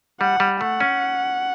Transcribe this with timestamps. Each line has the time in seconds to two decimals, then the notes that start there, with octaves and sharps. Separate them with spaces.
0.21 G3 F#5
0.40 G3
0.61 A3 F#5
0.80 C#4